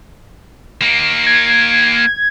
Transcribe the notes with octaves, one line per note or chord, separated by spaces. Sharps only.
A#3 D#4
G#6